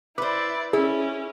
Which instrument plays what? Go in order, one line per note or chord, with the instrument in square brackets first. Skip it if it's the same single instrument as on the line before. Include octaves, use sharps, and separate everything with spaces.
[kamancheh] E4 D5 [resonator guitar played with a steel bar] B4 C5 [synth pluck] D6
[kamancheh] C#4 [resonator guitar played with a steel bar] E4 [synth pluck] G#4